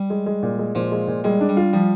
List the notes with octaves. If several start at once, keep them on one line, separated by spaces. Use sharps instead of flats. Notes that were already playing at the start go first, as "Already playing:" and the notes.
Already playing: G3
G#3
G#3
A#2
G#3
A#2 F3
G#3
A#2
G3 G#3
D4
G3
F4
F3 G3